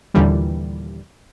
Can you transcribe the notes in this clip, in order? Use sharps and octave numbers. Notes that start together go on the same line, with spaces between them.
D#2 A#2 D3 E3 G3